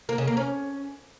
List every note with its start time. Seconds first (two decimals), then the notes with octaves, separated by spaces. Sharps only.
0.09 A#3
0.18 C#3
0.28 A#3
0.37 C#4